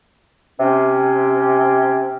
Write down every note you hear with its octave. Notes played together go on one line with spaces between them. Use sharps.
C3 C#4